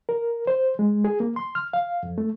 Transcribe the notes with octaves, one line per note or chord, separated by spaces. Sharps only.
A#4
C5
G#3
G#4
A#3
C6
F6
F5
F2
A3